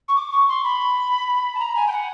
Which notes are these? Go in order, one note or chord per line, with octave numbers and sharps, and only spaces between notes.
C#6
D6
C#6
C6
B5
A5
A#5
G#5
G5
F#5